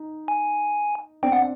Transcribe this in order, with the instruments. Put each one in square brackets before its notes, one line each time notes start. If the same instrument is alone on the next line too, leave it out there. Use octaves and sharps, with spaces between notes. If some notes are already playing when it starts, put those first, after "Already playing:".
Already playing: [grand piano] D#4
[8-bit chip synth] G#5
[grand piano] C4 D4 [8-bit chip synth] G5
[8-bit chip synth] F#5